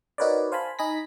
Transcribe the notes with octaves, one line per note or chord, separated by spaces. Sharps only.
D#4 F#4 A#4 B4 C#5 D5
C5 F5 G#5 A5 B5
D#4 D#5 G#5 B5 A#6 B6